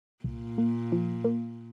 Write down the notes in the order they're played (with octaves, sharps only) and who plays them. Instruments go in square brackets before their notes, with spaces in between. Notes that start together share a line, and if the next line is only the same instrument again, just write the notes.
[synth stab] C2 [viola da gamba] A#2
[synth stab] A#3
F3
A#3